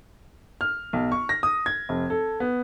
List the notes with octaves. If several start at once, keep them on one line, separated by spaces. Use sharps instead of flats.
F6
B1
C#6
A#6
D#6
G#6
F1
A4
B3